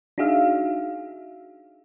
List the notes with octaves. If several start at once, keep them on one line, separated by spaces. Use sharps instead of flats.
D4 D#4 F#4 G#4 E5 F5